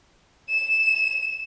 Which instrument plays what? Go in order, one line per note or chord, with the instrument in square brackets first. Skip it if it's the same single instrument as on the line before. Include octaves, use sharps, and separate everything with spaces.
[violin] E7